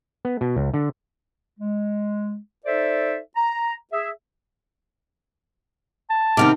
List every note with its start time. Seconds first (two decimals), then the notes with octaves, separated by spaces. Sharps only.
0.25 B3
0.41 B2
0.56 C#2
0.74 D3
1.59 G#3
2.66 D#4 A4 C5 D5 E5
3.36 A#5
3.92 G#4 E5
6.10 A5
6.37 C3 D#3 B3 C4 D6 F6